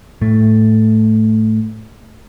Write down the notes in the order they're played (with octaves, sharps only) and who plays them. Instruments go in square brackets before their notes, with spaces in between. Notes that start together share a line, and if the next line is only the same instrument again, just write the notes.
[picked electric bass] A2 A3